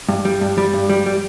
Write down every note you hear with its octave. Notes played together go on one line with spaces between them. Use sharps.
G2
G3
G2
G3
G2
G3
G3